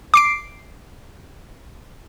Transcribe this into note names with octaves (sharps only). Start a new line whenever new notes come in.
D6 C7 D7